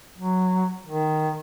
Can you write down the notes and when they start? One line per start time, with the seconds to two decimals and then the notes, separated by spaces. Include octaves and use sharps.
0.18 F#3
0.87 D#3